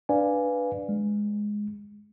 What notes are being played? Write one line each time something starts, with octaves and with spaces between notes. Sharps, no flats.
D4 B4 D5 F5 G#5
G#3